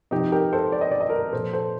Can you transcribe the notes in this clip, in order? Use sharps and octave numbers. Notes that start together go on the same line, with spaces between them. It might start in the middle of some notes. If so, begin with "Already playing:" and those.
C3 F3 D#4 G4
G4 A#4
A4 C5
D5
D#5
D5
D#5
A#4 D5
A#2 F3 A4 C5
A4 C5